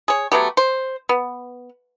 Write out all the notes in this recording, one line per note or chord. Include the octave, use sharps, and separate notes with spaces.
G#4 C#5
F#3 A3 B3 G4
C5
B3